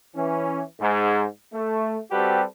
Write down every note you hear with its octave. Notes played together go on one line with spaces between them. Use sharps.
E3 C#4
G#2
A3
G3 C4 F#4 G4 A4 B4